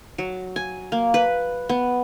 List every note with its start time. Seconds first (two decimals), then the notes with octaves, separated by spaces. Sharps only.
0.18 F#3
0.56 G#5
0.92 A#3
1.14 B4
1.69 B3